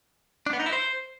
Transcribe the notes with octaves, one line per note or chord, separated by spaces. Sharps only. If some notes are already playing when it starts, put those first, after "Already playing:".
D4
B3
D#4
E4
C5